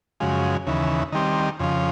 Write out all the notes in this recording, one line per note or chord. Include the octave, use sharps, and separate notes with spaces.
F#2 C#3 F3 G#3
D#2 C#3 E3
D#3 G3 C4
F2 C#3 F3